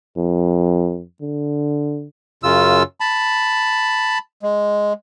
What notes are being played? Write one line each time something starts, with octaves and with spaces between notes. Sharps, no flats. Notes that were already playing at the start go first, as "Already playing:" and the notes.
F2
D3
F#2 C#3 F4 E6
A5 B5
G#3